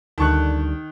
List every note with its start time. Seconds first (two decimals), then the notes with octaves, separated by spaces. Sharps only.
0.18 D2 D3 D#3 G3 A5 C#6 F#6